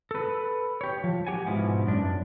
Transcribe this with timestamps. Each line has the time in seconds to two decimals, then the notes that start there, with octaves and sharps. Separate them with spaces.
0.11 A4 B4
0.81 G4 C#5
1.04 F3
1.27 G4 F#5 G#5
1.47 G#2 B2 F3 E4
1.86 F#2 D4